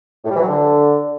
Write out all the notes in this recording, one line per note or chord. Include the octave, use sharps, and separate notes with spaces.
A2
G3
E3
F#3
D3